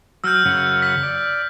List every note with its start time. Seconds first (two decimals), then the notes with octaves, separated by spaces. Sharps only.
0.24 F#3 E6 F6 G6
0.45 F#2 C#3 F#5
0.82 B6
1.03 D5